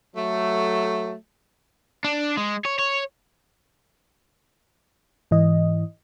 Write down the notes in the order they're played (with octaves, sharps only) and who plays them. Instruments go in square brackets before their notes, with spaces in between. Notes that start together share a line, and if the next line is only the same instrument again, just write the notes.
[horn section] F#3 A3
[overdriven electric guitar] D4
G#3
C#5
C#5
[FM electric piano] G#2 E3 D#5